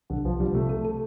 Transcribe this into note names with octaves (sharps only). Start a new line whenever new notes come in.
C2 D3
C2 F3
C2 G3
C3 A3
A4
A4